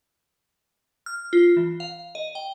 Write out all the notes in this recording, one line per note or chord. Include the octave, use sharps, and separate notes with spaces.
F6
F4
E3
F5
D#5
G5